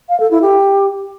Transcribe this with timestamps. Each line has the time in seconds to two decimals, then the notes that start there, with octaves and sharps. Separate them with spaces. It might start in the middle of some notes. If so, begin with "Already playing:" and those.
0.09 F5
0.20 A4
0.31 E4
0.42 G4